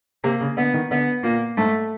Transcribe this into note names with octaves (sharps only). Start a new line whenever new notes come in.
C3 A#3
C#3
D3 B3
D#3
D3 B3
A#2 A#3
G#2 A3